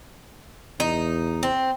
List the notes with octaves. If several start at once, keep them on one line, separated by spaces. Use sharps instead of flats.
E2 D#4
C4